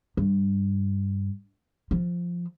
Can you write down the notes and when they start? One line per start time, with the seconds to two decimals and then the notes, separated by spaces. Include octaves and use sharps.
0.17 G2
1.91 F3